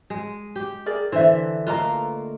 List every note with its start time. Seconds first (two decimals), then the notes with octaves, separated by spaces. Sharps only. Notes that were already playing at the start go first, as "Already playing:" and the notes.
0.10 G#3
0.56 G4
0.86 G#4 A#4 D5
1.12 D3 E3 C5 E5
1.67 A3 A#3 F4 B4 D#5 A#5